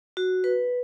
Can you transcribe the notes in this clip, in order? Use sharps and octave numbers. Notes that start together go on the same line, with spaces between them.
F#4
B4